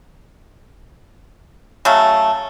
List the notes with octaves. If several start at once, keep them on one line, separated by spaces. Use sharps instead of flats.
C#3 F#3 A3